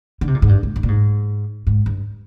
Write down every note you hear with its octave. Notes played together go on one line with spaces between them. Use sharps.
D3
C3
A#2
G#2
G2
G#2
G2
A#2
G#2
G#2
G2